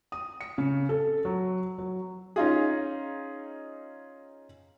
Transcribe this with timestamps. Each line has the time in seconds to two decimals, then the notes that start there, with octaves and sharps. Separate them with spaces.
0.12 D#6
0.41 C#7
0.58 C#3
0.89 A4
1.25 F#3
1.78 F#3
2.36 C#4 D#4 F4 G#4